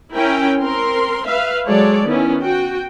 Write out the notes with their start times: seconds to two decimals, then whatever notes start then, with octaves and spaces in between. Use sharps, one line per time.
0.14 C#4 E4 A#4 G5
0.59 C4 A#4 C6
1.29 B4 E5 F5
1.67 F#3 G#3 A4 C#5 D5
2.06 D#3 B3 C#4 E4
2.42 F#4 G5